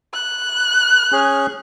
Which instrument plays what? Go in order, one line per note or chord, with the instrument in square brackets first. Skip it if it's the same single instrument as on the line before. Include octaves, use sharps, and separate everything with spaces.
[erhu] F#6
[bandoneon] C#4 G#4